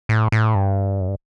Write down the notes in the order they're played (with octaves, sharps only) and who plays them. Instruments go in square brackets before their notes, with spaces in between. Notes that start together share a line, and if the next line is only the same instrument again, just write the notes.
[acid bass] A2
A2
G2
F#2
G2